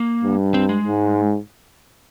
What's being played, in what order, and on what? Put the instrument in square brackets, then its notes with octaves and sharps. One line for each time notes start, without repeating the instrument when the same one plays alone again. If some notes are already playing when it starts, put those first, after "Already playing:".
Already playing: [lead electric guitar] A#3
[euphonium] G2
[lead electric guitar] C4
G#3
[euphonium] G#2